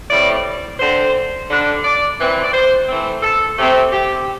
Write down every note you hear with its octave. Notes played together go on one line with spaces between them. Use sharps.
A2 G3 C4 D5
D3 C4 C5
D3 G3 D4
D5
E3 C4
D5
C5
E3 A3 C4
A4
C3 A3 C4
G4